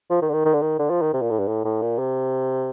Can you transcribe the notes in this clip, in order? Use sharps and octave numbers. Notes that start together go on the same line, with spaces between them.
F3
D#3
D3
D#3
D#3
D3
D#3
D3
F3
D#3
C3
A#2
A2
G2
A2
A2
A#2
C3